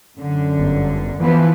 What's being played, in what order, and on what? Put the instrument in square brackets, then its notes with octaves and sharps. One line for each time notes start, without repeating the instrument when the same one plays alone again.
[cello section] F#2 D3
[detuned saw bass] G1
[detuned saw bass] E3 [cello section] F3 B3 B4